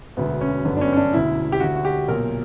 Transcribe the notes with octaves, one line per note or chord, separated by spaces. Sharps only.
E1 D2 D3 B3
C#4
G1 F#2 D3 B3
D4
C#4
C#4
D4
E1 D2 D3 E4
G4
D2 D3 F#4
F#4
G4
B1 A#2 A#4